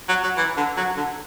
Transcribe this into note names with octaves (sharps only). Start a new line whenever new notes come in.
F#3
F#3
E3
D3
F#3
D3